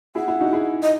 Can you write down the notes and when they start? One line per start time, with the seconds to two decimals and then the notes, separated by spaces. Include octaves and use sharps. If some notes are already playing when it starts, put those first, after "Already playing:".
0.15 E4 G#4 F#5
0.28 E4 G#4
0.40 D#4 F#4
0.53 E4 G#4
0.82 D#5